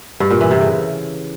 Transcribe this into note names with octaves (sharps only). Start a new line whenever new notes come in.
G2
A#2
E3
C3
C#3